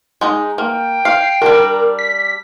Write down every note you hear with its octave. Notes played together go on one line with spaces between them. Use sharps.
G#3 D#4
A#3 G5
F5 C7
G3 D4 A#4
B6